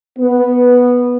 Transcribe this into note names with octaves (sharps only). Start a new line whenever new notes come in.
B3